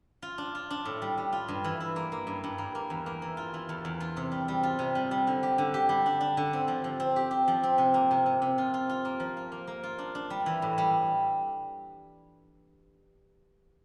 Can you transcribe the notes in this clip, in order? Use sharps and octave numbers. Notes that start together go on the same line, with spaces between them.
F4
D4
F4
D4
A2
G3
G3
F4
G2
E3
E4
A#3
A#3
G2
G2
A#3
A#3
E2
A#3
E3
F4
E3
E2
E2
F4
C3
G3
G3
F4
C3
G3
G3
D3
G4
D3
G4
G3
D4
D4
D3
C4
F3
F3
C4
G4
G4
F3
C4
C3
A#3
C3
C3
C3
F4
F4
F4
A#3
F3
F4
A#3
A#3
F4
D4
D4
G3
E3
A2
G3